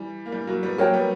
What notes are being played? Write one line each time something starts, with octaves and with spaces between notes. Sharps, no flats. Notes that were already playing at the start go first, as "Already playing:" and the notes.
Already playing: E3 G3
A#3
E3 G3
F#3 A#3
G3 B3
F#3 A#3 A#4 C#5 G5
G3 B3